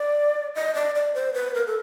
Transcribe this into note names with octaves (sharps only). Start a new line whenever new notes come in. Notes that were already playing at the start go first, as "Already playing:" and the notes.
Already playing: D5
D#5
D5
D5
C5
B4
A#4
A4